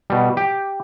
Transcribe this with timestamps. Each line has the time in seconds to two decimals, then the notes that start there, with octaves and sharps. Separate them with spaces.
0.10 B2 G3
0.37 G4